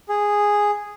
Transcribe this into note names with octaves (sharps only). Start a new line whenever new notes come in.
G#4